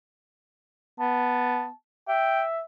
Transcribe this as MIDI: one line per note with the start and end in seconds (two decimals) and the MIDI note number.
1.00 1.68 59
1.00 1.72 81
2.08 2.64 76
2.08 2.43 79